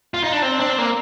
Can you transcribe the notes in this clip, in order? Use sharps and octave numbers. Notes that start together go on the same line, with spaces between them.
F4
D#4
D4
C4
D4
C4
A#3